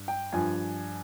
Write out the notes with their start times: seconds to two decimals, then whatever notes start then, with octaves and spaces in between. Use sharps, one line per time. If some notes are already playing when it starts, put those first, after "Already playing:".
Already playing: G2
0.08 G5
0.33 G2 F3 G#5